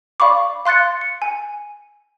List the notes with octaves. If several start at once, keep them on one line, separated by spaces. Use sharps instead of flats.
D5 F5 B5 C#6 D6
F5 C6 F#6 A6 C#7
C#7
G#5